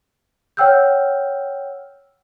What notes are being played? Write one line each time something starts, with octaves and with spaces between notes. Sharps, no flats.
C#5 F#5 G5 E6 F6 G6